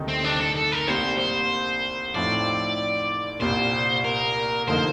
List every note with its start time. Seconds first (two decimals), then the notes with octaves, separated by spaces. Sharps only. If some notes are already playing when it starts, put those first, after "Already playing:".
Already playing: D2 C3 D#3 A3 D#4
0.09 C4
0.24 D4
0.41 A4
0.56 A4
0.72 A#4
0.88 C2 C3 G3 A#3 C5
1.19 C5
2.15 A2 F3 C4 D#4 D5
3.41 C2 A#2 G3 A#3 C5
4.05 A#4
4.68 D3 F3 A#3 D#4 C5